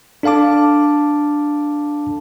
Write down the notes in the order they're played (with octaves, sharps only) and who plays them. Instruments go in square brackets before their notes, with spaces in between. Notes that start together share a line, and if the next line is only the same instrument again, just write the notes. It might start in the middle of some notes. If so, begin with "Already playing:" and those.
[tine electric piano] D4 A4 F5 A5 D6